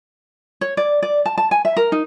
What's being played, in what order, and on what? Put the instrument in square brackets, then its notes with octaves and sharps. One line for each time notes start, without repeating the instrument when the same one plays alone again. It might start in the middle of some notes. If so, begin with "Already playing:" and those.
[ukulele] C#5
D5
D5
A5
A5
G#5
E5
A#4
D#4